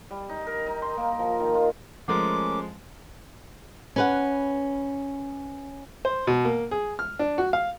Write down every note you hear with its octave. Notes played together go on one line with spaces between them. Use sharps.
G3
D#4
A#4
D#4
C6
A#3
F3
D#3
F4
F3 G#3 A3 C#4 A#4 D6
C#4 B4 F#5
C5
B2
A#3
G#4
F6
D4
F#4
F5